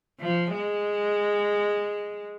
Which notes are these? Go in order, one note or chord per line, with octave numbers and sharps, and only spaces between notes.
F3
G#3